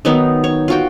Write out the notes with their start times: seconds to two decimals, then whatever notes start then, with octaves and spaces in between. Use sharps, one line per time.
0.05 D#3 F#3 B3 D#4
0.44 C#5
0.68 F4 F#4 G5